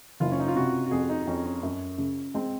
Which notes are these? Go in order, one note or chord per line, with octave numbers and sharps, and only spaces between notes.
F#1 F4
C#4
D#4
F4
C3 F#4
F#4
F2 G#4
D#4
F2 C#4
C#4
F#2
C#3
G#3 C4